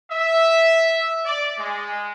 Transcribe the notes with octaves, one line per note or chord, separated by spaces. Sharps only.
E5
D5
G#3